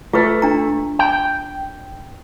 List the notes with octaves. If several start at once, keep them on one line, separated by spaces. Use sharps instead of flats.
A3 F4 B4
D4 A#5
G5